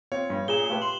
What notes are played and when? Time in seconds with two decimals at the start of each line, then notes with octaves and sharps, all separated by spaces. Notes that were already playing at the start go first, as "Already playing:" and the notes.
0.12 C4 F4 C#5
0.30 G2
0.48 A#2 G#4 E7 G7
0.70 A3 F4 G4 B4
0.82 C6 F#7